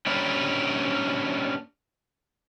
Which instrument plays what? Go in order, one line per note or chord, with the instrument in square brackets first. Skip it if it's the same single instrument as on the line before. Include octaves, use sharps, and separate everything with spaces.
[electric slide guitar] A#3 C#4 D4 G4 A#4 B4